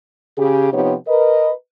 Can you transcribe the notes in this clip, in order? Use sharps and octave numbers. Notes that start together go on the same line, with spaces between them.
C#3 G4 G#4
C3 F3 B3 D#4 G4 C#5
A#4 B4 D#5